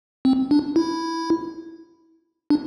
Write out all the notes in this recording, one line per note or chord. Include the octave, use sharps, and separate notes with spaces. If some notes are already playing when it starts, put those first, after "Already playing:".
C4
D4
E4
D4